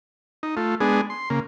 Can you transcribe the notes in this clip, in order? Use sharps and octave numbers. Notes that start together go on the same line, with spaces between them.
D#4
A3 F4
G#3 B3 D4 G#4
C6
C#3 A#3